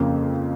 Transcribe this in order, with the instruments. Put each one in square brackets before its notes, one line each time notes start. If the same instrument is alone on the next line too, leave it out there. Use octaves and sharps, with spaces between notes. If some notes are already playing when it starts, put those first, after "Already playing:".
Already playing: [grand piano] F2 C#3 A#3